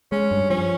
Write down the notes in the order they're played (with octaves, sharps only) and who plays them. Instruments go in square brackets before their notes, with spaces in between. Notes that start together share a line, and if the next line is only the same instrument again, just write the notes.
[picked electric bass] G#3 [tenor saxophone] C#4
[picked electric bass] G2
[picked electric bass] F3 [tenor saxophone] C#4